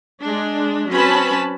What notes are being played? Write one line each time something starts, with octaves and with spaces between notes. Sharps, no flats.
G#3 D4
F#3 C4 C#4 B4 A5 B5